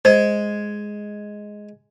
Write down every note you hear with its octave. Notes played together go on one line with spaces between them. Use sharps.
G#3 C5